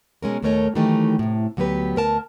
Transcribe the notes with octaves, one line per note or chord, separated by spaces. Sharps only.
B2 G#3 C#4 A#4
D#2 A#2 A3 A#4 C#5 D#5
D#3 E3 F#3 A3 D#4 G4
A2 C3
D2 F#3 B3 G4 B4
D2 A#4 A5